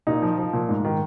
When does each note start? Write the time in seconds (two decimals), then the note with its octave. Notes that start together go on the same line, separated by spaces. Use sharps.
0.07 A#2 D#4
0.22 F3
0.38 F3
0.53 A#2
0.69 G#2
0.85 D#3